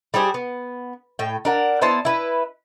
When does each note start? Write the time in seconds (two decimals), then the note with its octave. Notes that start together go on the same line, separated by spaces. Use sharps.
0.14 G3 G4 G#4 C5
0.34 B3
1.19 A2 G5
1.45 D4 A#4 F#5
1.82 B3 E4 C5 A5
2.05 E4 B4